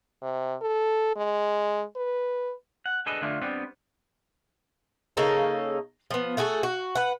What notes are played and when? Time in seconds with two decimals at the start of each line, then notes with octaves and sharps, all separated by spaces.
0.23 C3
0.61 A4
1.16 G#3
1.96 B4
2.86 F#5
3.06 D4 G#4 A4 B4 D#5
3.22 D3 A3 D4 F4
3.42 G3 B3 C4 D4
5.17 C#3 A#3 D#4 A4
6.11 F3 B3
6.37 A3 F#4 G#4 A4
6.63 F#4
6.95 B4 F#5